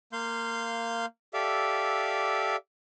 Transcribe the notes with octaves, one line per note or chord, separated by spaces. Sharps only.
A#3 F5 C6 G6
G4 A4 D5 E5 F5